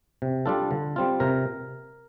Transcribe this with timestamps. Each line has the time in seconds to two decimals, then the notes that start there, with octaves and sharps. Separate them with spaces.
0.22 C3
0.46 G3 D4 F4 A4
0.71 D3
0.96 G3 C4 F4
1.20 C3 A#4